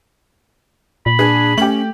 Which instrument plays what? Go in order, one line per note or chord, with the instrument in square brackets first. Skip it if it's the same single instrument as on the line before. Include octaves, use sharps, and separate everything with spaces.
[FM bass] A#2 [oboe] B5
[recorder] D4 [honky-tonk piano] G#4
[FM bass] A3 [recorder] C#4 [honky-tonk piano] G4 F#7